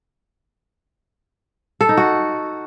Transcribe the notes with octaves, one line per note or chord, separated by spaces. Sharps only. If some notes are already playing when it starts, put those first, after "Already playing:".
A4
D#4
F#4